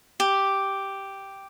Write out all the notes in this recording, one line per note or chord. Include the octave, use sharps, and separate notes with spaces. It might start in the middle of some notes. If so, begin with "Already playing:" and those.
G4